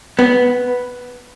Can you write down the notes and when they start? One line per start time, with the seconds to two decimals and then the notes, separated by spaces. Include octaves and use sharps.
0.19 B3